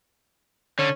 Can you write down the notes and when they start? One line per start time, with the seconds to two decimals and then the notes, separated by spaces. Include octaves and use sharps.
0.79 D3 C#4